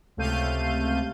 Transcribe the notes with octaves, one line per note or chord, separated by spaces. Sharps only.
C#2 C3 A3 F5 G6 D#7